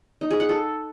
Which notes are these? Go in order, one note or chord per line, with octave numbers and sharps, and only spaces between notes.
D#4
G#4
F#5
A4